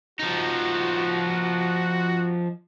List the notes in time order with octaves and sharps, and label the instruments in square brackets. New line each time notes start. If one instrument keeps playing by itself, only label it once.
[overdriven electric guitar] F3 D#4 [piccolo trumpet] F#4